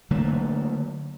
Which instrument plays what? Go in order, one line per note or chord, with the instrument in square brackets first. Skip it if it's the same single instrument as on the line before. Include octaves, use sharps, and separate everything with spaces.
[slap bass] D3 F#3 A3 A#3